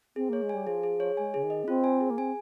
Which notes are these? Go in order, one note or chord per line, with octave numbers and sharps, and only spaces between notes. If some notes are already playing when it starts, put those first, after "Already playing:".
C4 G#4
A#3 C#5
G#3
G3 G#5
F3 G#4
G#4
C#5
G#3 G#5
C#3 G#4
D#3
D#5
C#4
C4 F4
G#5
G#4
A#3
C4 G#5